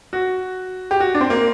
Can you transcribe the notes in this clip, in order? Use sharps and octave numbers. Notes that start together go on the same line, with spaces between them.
F#4
G4
F#4
D4
C4
A#3